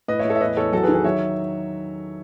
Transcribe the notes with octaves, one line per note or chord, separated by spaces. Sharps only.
A2 B4 D#5
C#5 E5
A2
A4 C#5
E5
E2 B4 D#5
E2 A4 C#5
F#3 F#4 A4
G#4 B4
D#3
G#4 B4
F#3 C#5 E5